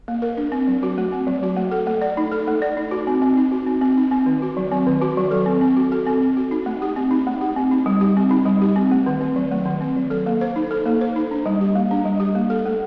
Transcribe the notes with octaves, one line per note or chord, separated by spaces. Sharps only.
A#3
A#4
D4
C4
F#3
F#4
A3
C4
F#3
F#4
A3
A4
A3
D5
D#4
A4
A3
D5
D#4
F#4
C4
C4
D#4
F#4
C4
C4
D#4
C4
D#3
F#4
F#3
C4
D#3
F#4
F#3
A4
C4
C4
F#4
A4
C4
C4
F#4
D#4
A3
G4
C4
D#4
A3
G4
C4
D#4
G3
G4
C4
D#4
G3
G4
C4
A3
D#3
C4
F#3
A3
D#3
C4
F#3
A4
A#3
C5
D#4
A4
A#3
C5
D#4
D4
G3
G4
A#3
D4
G3
G4
A#3
A4
A3